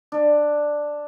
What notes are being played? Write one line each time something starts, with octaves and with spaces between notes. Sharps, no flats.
D4